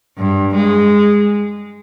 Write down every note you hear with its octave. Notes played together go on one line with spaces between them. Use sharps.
G2
G#3